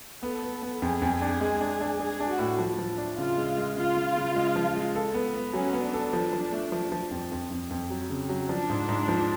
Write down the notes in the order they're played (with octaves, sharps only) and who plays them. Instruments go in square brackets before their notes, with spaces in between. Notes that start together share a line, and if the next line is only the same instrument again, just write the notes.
[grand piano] B3 [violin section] A4
[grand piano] B3
B3
[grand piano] F2 [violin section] G#4
[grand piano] F2
D4
G#3
D4
D4
[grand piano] D4 [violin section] G#4
[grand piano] D4
[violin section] F#4
[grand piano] A2
F3
F3
D4
[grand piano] C#3 [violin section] F4
[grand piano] G#3
G#3
[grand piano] C#3 [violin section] F4
[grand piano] C#3
C#3
G#3
F3
G#3
A4
B3
B3
[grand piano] F#3 [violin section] C#4
[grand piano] B3
[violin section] D4
[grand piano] A4
F3
F3
A3
F3
F3
F2
F2
F2
F2
F#3
C#3
F#3
[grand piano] F3 [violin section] D4
[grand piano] G#2
G#2
F3